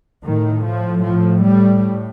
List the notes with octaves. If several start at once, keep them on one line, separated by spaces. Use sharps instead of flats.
A2 D#3
F3
F3
G3